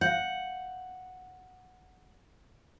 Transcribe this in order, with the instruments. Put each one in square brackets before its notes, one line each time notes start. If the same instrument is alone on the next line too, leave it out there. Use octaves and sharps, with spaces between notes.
[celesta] F5 G6 [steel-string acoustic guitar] F#5